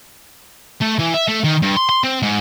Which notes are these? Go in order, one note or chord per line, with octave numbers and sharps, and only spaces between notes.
A3
E3
E5
A3
D#3
G2
C6
C6
C4
G#2